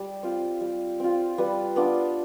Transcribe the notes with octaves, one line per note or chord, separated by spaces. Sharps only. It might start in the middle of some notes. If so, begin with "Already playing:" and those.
Already playing: G3
C4 F4
G3
C4 F4
G3 B4
B3 D4 F4